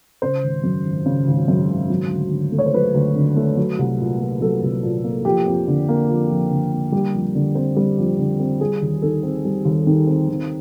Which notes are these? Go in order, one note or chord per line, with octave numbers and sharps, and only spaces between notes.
C#3 C5
G#1
F#2
G#1
C#3
G#1
F#2
G#1
F#3
D2
D3
A3
C#5
C5
F#3 B4
D2
D3
A3
F#3
C2
A#2
A#3
F#3 A4
C2
A#2
A#3
F3 G4
F2
D3
A#3
F3
F2
D3
A#3
G3 G4
F2
D3
C4
G3
F2
D3
C4
G3 G#4
D#2
D#3 A4
C4
G3
D#2
D#3
C4
D#3